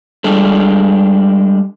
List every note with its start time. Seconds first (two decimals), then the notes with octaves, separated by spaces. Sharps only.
0.24 G3 G#3 D4 A4